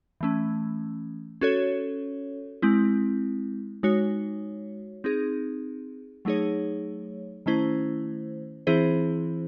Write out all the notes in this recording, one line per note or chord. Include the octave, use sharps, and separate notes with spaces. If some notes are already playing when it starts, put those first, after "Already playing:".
E3 A3 C#4
C#4 F#4 A4 C#5
G#3 C4 E4
G#3 D#4 F#4 C#5
C4 D#4 G#4
F#3 A3 D#4 G#4 C#5
D#3 A3 C#4 E4 C5
E3 C4 E4 G#4 C5